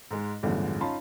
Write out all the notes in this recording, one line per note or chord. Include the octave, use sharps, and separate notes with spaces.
G#2 G#3
A1 E2 G2 D3 F3 G#3
C#4 D#4 F4 A5 B5 C6